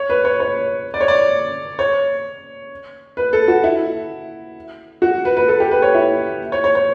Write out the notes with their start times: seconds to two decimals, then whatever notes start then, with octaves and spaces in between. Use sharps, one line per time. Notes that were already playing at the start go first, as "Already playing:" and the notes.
Already playing: C#5
0.10 B4
0.25 C#5
0.40 C#5
0.94 D5
1.01 C#5
1.08 D5
1.79 C#5
3.17 B4
3.33 A4
3.48 F#4
3.64 E4
5.02 F#4
5.25 B4
5.37 B4
5.48 A4
5.60 G4
5.71 B4
5.82 C#5
5.94 E4
6.52 C#5
6.64 C#5
6.75 C#5